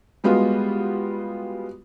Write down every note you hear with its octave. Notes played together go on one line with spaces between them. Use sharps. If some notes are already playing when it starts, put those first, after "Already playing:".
G3 G#3 B3 F4 F#4